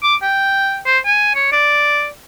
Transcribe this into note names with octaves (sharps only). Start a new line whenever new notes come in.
D6
G5
C5
G#5
C#5
D5